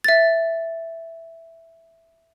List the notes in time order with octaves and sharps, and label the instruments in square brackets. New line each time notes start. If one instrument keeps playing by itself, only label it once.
[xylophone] E5 A6